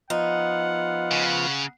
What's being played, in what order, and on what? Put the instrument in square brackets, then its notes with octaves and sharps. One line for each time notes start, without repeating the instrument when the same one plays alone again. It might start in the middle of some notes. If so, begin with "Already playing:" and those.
[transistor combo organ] F3 B3 F4 [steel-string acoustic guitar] D#4 [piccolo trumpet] F#5
[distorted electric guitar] C#3